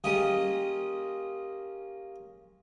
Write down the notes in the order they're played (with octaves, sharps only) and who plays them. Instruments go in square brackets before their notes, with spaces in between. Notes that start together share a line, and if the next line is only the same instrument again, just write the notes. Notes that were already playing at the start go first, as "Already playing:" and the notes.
[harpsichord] A#3 C#4 F4 G4 G#4 D#5